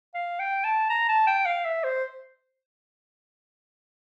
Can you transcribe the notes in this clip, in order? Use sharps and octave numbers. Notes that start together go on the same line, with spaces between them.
F5
G5
A5
A#5
A5
G5
F5
E5
C5